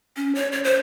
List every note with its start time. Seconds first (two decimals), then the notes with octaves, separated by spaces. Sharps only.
0.17 C#4
0.35 C#5
0.52 C#5
0.64 C5